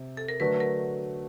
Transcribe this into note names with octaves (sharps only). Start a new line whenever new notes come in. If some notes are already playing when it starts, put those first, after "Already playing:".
Already playing: C3
A4
A#4
D3 F#3 A3 D4 F#4 B4
A#4